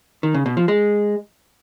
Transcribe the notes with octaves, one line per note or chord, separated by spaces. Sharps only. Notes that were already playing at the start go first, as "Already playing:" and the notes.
D#3
C#3
B2
F3
G#3